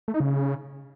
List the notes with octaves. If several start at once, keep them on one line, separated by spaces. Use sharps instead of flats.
A3
D#4
C#3